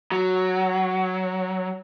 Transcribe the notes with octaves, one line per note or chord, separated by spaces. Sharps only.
F#3